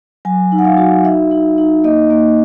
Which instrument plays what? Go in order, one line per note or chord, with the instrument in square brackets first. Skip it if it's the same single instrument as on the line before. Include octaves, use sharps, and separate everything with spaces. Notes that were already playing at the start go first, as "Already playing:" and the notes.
[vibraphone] F#3 G#5
D#4
F#5
F5
F#4
D#4 E5
D#4
D#4
A#3 D#5
A#3